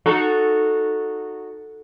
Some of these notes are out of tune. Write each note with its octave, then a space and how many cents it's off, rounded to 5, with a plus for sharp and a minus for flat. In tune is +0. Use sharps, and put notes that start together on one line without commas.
D#4 -15 F#4 -10 A4 +0